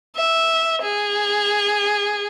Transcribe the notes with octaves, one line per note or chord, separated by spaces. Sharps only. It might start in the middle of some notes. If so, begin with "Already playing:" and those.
E5
G#4